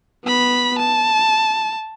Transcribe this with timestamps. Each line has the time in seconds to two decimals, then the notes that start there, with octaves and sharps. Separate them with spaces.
0.24 B3 B5
0.79 A5